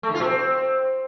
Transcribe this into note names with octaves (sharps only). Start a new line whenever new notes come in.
A3
D3
F4
B2
C4